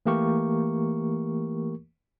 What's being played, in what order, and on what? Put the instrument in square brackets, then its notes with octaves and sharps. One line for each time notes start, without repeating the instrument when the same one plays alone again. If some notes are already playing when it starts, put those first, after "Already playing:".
[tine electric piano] E3 A3 A#3 G4 A#4 C#6